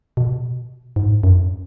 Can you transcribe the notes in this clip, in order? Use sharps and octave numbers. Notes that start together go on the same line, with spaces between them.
B2
G#2
F#2